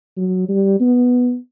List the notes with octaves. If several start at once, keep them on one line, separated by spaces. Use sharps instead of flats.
F#3
G3
B3